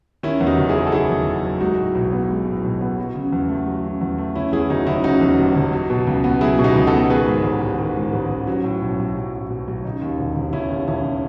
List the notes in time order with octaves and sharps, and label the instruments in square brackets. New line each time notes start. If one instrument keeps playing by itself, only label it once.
[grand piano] D#3 C#4 E4
E2
D#4 F#4
F#1
E4 G#4
F#3
A4
D#3 E4 G#4
E2
F#1
F#3
G#3 D#4 F#4
A2
B1
B3
G#3
A2
B1
B3
F#3
C#3
E2
A3
F#3
C#3
E2
A3
C#3 C#4 E4
E2 E4 G#4
F#1 D#4 F#4
F#1 C#4 E4
C#3 D#4 F#4
E2
F#1
F#1
F#3
B2
C#2
B3
F#3 E4 G#4
B2
D#4 F#4
C#2
F#4 A4
B3
D#3 G#4 B4
G#2
A1
A1
D#3
G#2
A1
A1
F#3 C#4
A2
B1
B1
F#3
A2
B1
B1
C#3 D#4
D#2
E1
E1
C#3 C#4 E4
D#2
E1 C#4 E4